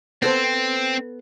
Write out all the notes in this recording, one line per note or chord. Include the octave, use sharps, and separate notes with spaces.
B3 C4 A4 C5